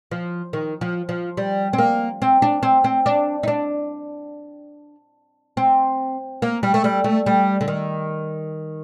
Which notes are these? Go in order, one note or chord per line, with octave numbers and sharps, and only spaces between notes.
F3
D#3
F3
F3
G3
C4
A#3
C4
D4
C4
C4
D4
D#4
D4
C4
A#3
G3
A3
G3
A3
G3
D3
D#3